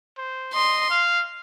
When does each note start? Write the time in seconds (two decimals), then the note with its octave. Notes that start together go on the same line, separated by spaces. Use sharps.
0.18 C5
0.54 D#5 C6
0.90 F5